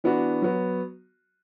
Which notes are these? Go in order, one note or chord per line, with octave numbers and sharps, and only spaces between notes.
E3 B3 D4 F#4
F#3 B3 F#4